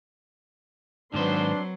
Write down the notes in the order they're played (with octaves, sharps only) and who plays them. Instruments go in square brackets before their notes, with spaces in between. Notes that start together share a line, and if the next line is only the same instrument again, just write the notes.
[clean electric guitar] G#2 D#3 C5 [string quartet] F#3 [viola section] C4 B4 C6 [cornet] D4